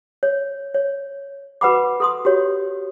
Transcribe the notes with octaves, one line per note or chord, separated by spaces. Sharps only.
C#5
C#5
F#4 B4 F#5 B5 D6
A4 C6 D#6
F#4 G4 C#5